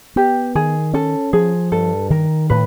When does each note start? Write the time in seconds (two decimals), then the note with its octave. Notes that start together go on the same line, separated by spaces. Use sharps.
0.16 B3 G4
0.55 D#3 G#4
0.94 C#4 A4
1.33 F3 G#4
1.72 G2 A4
2.10 D#3 A#4
2.50 A2 B4